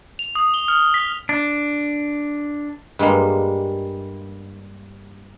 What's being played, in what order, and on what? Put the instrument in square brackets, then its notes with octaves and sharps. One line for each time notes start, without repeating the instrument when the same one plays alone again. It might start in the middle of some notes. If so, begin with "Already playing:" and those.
[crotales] F7
D#6
G7
F6
B6
[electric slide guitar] D4
[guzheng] G2 G3 G#3 A#3 C6